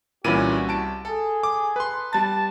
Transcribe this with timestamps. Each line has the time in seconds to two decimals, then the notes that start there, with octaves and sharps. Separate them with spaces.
0.24 C2 A#2 E3 C#4 F#4 B5 D#7
0.69 A5 D7
1.05 G#4 A4
1.43 D6
1.76 B4 C6
2.13 G3 A5 A6